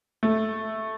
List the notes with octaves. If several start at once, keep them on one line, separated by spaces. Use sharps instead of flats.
A3